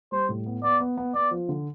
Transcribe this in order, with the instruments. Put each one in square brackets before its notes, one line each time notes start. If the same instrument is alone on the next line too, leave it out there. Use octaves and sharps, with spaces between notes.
[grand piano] G3 [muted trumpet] C5
[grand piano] A2
B3
[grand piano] B3 [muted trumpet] D5
[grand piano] B3
B3
[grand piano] B3 [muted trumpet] D5
[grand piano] F3
D3